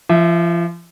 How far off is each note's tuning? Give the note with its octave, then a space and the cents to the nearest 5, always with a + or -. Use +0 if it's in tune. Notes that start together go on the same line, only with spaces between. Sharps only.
F3 -35 E5 -5